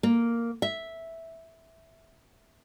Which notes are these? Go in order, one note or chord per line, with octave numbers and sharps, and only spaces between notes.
A#3
E5